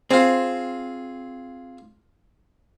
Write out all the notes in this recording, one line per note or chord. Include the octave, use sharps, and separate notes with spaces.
C4 F4 G#4